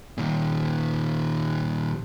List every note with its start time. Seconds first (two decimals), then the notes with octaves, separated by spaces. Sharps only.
0.18 A#2 D#3